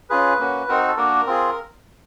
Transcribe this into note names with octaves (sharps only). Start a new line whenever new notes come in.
C#4 F4 G#4 B4
A#3 C#4 F#4
C4 D#4 F#4 A#4
A4
A#3 D4 F#4 A#4
C4 F4 G#4